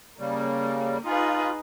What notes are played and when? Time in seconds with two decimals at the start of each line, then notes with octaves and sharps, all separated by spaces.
0.19 C#3 G3 A#3
1.05 D#4 F4 G#4 B4